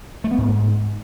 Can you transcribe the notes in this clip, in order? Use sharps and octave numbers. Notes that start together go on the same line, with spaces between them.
A3
B3
G#2